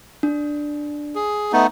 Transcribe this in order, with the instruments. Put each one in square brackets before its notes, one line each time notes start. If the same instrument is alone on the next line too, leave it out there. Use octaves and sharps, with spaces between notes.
[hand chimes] D4
[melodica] G#4
A3 B3 D#4